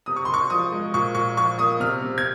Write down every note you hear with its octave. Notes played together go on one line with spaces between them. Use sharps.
C3 D#6
C#6
C3 C6
C#6
F3 D#6
G#3
A#2 C#6
A#2 C#6
F3 C#6
A#3 D#6
C3 F6
C3
G#6